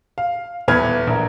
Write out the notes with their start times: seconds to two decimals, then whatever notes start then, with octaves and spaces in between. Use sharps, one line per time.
0.18 F5
0.68 D#1 E2 B4 F6 G#6
1.07 A#1 A#4